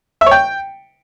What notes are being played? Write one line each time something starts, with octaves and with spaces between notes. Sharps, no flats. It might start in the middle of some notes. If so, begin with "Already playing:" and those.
E5
C#5
G5